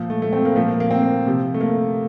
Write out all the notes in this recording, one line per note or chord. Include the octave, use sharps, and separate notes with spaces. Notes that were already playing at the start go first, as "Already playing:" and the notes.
Already playing: A#2 F3
A3
A3
A3 C4
A#3
A#2 F3 A3
A#3
A#3
C4
A#3
C3 F3
A3
A#3